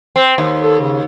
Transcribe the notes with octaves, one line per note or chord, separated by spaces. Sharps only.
C4
D#2
A4
C#3